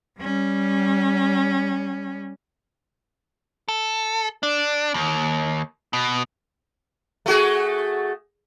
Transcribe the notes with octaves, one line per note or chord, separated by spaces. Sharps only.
G3 C#4
A4
D4
D#2
B2
A3 F#4 G#4